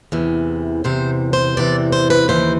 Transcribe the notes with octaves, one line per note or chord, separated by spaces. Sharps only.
E2 C3 E3
E2 C3 E3 C5
C5
E2 C3 E3 D5
C5
B4
D#2 C#3 E3 C5